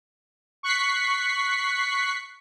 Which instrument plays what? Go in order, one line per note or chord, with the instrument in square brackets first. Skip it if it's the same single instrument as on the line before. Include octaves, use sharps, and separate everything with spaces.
[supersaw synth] C#6 F#6 B6 C7